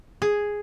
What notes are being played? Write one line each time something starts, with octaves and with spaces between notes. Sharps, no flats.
G#4